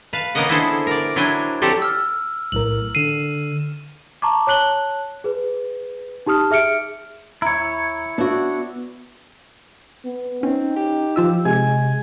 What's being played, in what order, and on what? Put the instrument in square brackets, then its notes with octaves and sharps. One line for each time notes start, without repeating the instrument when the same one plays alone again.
[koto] B4 F5 A5
C#3 A#3 B3 A#4 D#5 F#5
D3 B3 E4 G#4 A4 C5
A#4 D5
F#3 D4 E4 C5 G5 G#5
F#3 C4 G4 A4 C5 D5
[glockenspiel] E6 F6
[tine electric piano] B1 A2 A#4 [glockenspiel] F#7
[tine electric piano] D3 C7 [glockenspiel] D#7 E7
[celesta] A5 A#5 C#6 D6
C#5 A5 F#6 F#7 G7
G#4 B4
D#4 G4 A5 D#6 F6
G#4 E5 F6 C#7 D7
[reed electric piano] D#2 A#5 [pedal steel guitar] E4 C#5
[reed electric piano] B3 [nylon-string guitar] D4 F#4
[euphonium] B3
[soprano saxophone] C4 [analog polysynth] C#4 [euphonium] D#4
[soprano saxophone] G4
[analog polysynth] F3 F4 E6 [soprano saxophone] G4
[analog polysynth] C3 [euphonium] G#3 [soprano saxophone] G#5